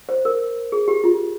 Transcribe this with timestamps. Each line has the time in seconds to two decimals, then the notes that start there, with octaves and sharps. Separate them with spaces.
0.09 C5
0.25 A#4
0.72 G#4
0.88 G4
1.04 F4